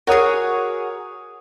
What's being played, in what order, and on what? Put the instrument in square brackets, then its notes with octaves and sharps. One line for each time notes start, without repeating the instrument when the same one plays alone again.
[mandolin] F#4 G#4 [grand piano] A#4 C#5 D#6